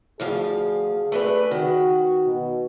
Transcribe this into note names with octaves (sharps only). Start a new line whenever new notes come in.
D2 F3 G#4 F5
A3 D4 B4
D#3 F#4
B2